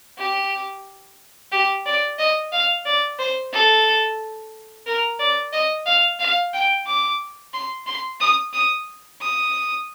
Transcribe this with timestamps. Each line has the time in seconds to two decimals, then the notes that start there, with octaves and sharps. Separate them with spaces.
0.18 G4
1.52 G4
1.86 D5
2.19 D#5
2.52 F5
2.85 D5
3.19 C5
3.53 A4
4.86 A#4
5.19 D5
5.53 D#5
5.86 F5
6.20 F5
6.54 G5
6.86 D6
7.53 C6
7.87 C6
8.20 D#6
8.53 D#6
9.21 D#6